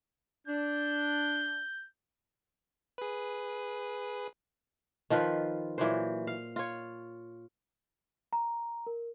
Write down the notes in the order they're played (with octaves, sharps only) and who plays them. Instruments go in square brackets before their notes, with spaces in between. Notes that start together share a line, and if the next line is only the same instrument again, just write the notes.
[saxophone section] D4 [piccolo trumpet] G6
[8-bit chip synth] G#4 B4
[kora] D#3 F3 F4 B4
A#2 E3 F#3 C5
F5
F4 C#5
[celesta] A#5
A#4